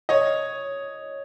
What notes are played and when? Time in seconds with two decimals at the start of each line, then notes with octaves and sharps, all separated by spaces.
0.09 C#5 D#5